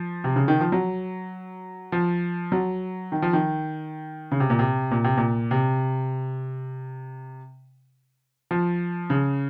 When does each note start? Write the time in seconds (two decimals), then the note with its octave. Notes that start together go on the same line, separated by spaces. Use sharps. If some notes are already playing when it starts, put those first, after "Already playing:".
Already playing: F3
0.24 C3
0.36 C#3
0.48 D#3
0.60 F3
0.72 F#3
1.92 F3
2.52 F#3
3.12 D#3
3.22 F3
3.33 D#3
4.31 C#3
4.40 C3
4.50 A#2
4.59 C3
4.91 A#2
5.04 C3
5.17 A#2
5.51 C3
8.51 F3
9.10 C#3